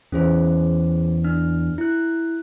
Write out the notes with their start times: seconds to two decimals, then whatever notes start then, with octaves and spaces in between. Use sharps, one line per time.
0.12 E2 C#4 G#4 C5
1.24 D4 F6
1.78 E4 F#6